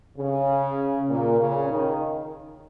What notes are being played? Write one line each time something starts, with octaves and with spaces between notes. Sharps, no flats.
C#3
A#2
C#3
D#3